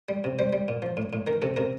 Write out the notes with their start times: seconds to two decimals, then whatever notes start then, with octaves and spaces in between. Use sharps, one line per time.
0.09 G3
0.24 C3
0.39 G3 C5
0.53 G3
0.68 A#2
0.82 F3
0.97 A2
1.13 A2
1.27 D#3 A#4
1.42 C3 A4
1.56 C3 A#4